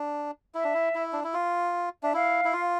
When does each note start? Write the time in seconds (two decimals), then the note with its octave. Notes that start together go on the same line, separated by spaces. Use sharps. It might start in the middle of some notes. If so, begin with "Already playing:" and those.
Already playing: D4
0.55 E4 E5
0.64 D4
0.74 E4
0.95 E4
1.13 D4
1.24 E4
1.34 F4
2.02 D4 E5
2.14 E4 F5
2.45 E4
2.53 F4